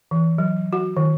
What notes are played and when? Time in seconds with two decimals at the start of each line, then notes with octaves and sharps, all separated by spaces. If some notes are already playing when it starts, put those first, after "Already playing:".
0.11 E3
0.38 F#3
0.73 F#4
0.97 D#3